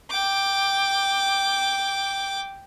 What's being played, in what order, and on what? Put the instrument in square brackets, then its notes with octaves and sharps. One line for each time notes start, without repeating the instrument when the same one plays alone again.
[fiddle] G5 D6